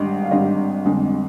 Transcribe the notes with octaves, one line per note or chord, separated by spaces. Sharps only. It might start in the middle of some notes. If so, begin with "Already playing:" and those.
Already playing: G#1 G2 D3 G3 D#5
F5
G#1 G2 D3 G3 D#5
G1 F2 D3 G#3